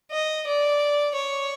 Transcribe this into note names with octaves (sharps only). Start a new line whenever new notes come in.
D#5
D5
C#5